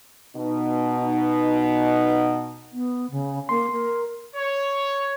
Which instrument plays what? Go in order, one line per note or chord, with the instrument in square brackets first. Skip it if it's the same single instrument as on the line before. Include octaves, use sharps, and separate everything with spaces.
[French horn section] B2 D#4
[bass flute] B3
C#3
[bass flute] A#3 [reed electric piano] C6
[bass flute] A#4
[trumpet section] C#5